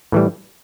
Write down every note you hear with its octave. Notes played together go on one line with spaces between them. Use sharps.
A2 E3 G3